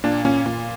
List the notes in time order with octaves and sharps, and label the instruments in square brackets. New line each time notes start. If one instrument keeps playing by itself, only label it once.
[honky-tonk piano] A#2 [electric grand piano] D4
[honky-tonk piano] A#2 [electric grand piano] C#4
[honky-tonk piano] A#2